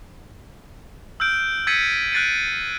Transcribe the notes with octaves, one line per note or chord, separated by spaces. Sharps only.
E6 F6 G6 D7
E6 G#6 A6 B6 C#7 D#7
F#6 G6 A6 C7 D7 D#7